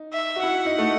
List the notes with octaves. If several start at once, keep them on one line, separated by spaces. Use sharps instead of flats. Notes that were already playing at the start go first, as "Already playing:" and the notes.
Already playing: D#4
E5
F#4
E4 F#5
D#4
A3